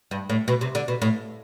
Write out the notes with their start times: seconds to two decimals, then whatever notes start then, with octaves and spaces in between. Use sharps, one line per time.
0.11 G2
0.30 A2
0.48 B2
0.61 C3
0.75 D3
0.88 B2
1.02 A2